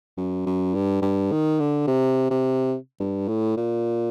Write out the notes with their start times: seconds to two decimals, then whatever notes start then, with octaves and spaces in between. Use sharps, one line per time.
0.17 F#2
0.46 F#2
0.75 G2
1.02 G2
1.31 D#3
1.59 D3
1.87 C3
2.30 C3
3.00 G2
3.28 A2
3.57 A#2